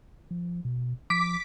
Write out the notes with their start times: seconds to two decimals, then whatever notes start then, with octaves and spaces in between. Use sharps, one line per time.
0.31 F3
0.65 B2
1.10 F3 D6 B6